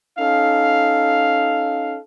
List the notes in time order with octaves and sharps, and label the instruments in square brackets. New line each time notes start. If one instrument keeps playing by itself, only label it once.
[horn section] C#4 D#4 A4 F5